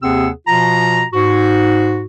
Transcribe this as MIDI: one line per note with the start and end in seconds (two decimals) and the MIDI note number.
0.01 0.28 39
0.01 0.28 48
0.01 0.28 60
0.01 0.28 68
0.01 0.28 78
0.01 0.28 88
0.46 1.03 47
0.46 1.03 53
0.46 1.03 65
0.46 1.03 82
1.12 2.06 44
1.12 2.06 66